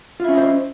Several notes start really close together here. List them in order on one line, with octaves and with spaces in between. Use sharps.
F4 E4 C#4 D#5 C5